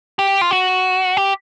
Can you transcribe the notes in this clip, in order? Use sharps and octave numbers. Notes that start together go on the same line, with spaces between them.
G4
F4
F#4
G4